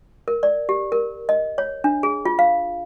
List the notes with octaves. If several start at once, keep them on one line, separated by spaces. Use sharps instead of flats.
A#4
D5
G4
A#4
D#5
C#5
D4
G#4
F4
F5